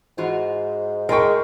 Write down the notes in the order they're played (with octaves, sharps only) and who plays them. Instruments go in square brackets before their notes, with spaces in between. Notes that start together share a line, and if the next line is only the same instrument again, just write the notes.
[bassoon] G#2 [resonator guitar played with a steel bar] E3 F4 F#4
[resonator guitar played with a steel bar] A2 D5 G5 [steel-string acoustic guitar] G#3 [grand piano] A#4 C#6